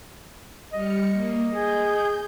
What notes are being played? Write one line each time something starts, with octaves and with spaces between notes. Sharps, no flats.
G3 D#5 F6 C#7
A#3
G#4 G6